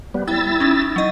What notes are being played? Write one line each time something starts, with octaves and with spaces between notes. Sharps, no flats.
G3 B3
E4 G5 E6 A6
C#4 D#4
F#3 D#5